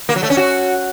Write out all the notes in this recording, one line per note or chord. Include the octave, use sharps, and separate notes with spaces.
A#3
F#3
A3
C#4
F#4